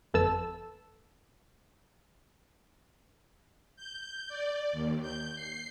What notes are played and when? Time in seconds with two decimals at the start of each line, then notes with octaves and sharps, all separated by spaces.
0.14 G1 F2 A4 B4 A5 E6
3.76 G6
4.28 D5
4.72 D#2
5.02 G6
5.35 C7